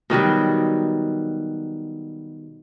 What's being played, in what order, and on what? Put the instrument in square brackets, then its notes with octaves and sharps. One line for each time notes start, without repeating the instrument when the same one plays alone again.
[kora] B2 D#3 F#3 G3